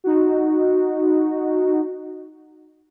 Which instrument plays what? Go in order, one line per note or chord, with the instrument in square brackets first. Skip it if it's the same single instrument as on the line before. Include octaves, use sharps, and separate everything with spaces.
[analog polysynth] D#4 F#4